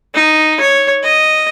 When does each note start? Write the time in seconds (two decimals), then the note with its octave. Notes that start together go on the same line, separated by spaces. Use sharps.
0.14 D#4
0.60 C#5
1.03 D#5